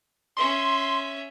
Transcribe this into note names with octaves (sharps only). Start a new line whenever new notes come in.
C#4 E5 C6